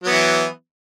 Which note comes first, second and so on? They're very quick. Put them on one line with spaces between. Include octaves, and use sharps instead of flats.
F#3 B3 E3